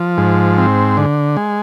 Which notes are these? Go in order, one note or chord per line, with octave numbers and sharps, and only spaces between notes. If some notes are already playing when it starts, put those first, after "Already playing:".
Already playing: F3
G#2
C4
D3
G#3